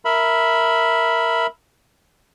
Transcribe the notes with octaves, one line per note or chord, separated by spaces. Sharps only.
A#4 E5 B5